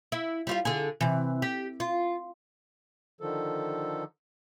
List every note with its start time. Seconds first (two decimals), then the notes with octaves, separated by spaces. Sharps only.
0.12 E4
0.47 G3 F4 F5
0.65 D3 G#4
1.01 C3 E3
1.42 G4
1.80 F4
3.21 D3 D#3 F3 A4